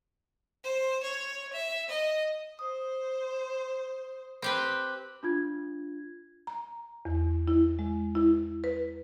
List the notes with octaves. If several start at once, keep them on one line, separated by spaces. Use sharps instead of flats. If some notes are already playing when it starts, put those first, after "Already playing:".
C5
C#5
E5
D#5
C5 D#6
C4 G4 B4
D4 F4 G#6
A#5
E2
E4
G#3
E4
B4